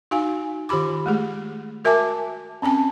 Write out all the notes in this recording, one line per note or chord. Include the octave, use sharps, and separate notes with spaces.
D#4 F#4 F5 G#5
D#3 F4 G4 B5 D6
G#3 A3 G#4
F#4 A#4 E5 G#5 A5 D6
C4 C#4 G#5 A5